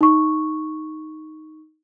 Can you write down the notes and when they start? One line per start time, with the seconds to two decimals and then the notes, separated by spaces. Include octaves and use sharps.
0.01 D#4 C#6